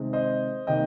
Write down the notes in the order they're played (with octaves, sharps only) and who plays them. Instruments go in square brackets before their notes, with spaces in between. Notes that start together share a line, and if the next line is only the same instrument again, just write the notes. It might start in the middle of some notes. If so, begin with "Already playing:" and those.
Already playing: [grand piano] C3 D#3 G#3 C4
C5 D#5
C3 D#3 G3 A#3 D#5 G5